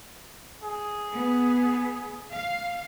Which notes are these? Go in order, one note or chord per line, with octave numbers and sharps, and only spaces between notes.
G#4
B3
F5